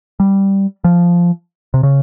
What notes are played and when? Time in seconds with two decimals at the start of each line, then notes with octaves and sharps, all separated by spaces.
0.20 G3
0.84 F3
1.74 C3
1.83 C#3